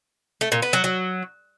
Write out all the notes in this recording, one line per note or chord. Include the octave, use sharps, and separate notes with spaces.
A3
A#2
B3
F#3
F#3